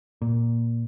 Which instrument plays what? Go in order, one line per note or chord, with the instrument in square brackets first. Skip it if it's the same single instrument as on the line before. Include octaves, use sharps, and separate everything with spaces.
[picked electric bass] A#2